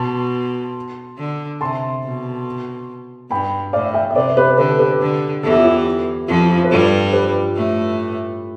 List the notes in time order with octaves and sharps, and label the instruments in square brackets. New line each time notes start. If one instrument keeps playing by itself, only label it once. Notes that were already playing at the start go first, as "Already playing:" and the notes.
Already playing: [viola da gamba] B2 [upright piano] A5 C6
[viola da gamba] D3
[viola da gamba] C3 [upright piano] A5 C6
[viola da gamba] B2
[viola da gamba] G2 [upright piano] G5 B5
[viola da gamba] A2 [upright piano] D5 F5
[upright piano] E5 G5
E5
[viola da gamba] C3 [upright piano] B4 D5
[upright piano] G4 B4
[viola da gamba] D3 [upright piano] B4
[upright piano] A4
G4 B4
[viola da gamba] D3
[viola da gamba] E2 E3 [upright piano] A4
[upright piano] G4
F4 A4
E4 G4
[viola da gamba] F2 F3 [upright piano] F4
[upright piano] F4
B4
[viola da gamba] G2 G3 [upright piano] F4 A4
[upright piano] G4 B4
[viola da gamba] A2 A3